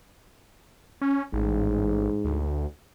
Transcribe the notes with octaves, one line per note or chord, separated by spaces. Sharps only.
C#4
A1 G#2
D2